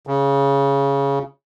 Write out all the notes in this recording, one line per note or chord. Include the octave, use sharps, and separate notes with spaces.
C#3